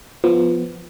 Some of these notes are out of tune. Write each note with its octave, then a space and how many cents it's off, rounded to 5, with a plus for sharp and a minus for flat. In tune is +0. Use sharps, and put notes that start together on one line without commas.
F3 +0 B3 +0